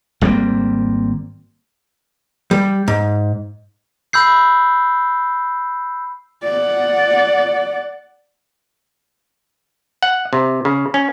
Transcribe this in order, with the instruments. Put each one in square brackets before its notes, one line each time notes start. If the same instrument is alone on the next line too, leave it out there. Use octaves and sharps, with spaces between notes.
[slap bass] G#1 G3 A#3 C4
[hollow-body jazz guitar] G3
G#2
[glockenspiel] B5 E6 G6 C7
[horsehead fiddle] D5 F#5
[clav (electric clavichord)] F#5
C3
C#3
C#4